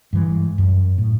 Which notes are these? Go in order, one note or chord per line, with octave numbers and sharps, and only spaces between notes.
G2 E3 G#3
F#2
A2